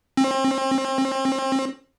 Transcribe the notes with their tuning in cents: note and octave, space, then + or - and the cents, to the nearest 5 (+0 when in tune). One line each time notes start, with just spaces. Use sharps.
C4 +35